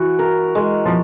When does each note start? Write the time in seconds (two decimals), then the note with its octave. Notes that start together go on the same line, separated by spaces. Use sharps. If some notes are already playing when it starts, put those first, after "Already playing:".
Already playing: E3 F#4
0.19 A#4
0.55 G#3
0.85 F3